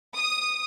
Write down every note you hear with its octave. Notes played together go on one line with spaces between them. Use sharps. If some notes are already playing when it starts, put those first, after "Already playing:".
D#6